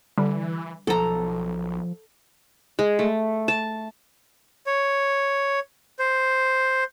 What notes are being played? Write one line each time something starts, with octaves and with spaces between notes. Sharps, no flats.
D3 E3 G3
B1 F3 A4 A#5
G#3
A3
A5
C#5
C5